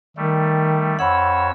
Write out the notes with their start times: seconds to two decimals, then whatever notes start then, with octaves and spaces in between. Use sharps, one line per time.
0.17 D#3 G3 A3
0.99 F2 C#5 F#5 B5 E6